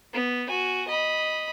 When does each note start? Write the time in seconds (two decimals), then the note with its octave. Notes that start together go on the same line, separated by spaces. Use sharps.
0.13 B3
0.47 F#4 G#5
0.88 D#5 B5